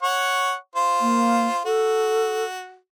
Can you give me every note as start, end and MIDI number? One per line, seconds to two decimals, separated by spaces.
0.03 0.55 73
0.03 0.55 78
0.03 0.55 85
0.76 1.62 65
0.76 1.62 72
1.01 1.48 58
1.65 2.77 66
1.65 2.44 69